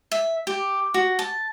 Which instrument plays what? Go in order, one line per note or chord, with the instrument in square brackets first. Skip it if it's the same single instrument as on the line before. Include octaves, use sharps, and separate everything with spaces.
[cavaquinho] E5
G4
F#4
A5